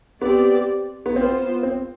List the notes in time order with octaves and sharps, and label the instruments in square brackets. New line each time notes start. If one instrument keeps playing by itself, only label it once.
[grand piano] B3 [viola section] C4 G4 D5
[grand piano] B3
[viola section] B3 F4 C5 [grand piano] C4
[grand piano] C4